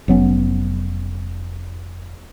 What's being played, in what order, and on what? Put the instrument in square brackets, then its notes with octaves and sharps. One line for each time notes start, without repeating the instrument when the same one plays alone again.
[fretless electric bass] F1 F#3 B3 C#4